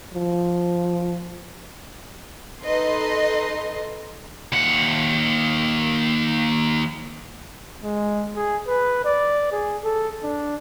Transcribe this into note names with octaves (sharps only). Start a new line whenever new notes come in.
F3
D#4 A4 B4 D#5 C6
D#2 F#5
G#3
G#4
B4
D5
G#4
A4
D4